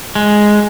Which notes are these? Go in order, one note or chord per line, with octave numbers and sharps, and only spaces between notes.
G#3